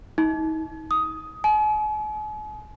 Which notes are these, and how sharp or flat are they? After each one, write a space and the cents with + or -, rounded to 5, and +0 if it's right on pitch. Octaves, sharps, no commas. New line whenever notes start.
D#4 +35
D#6 +10
G#5 +45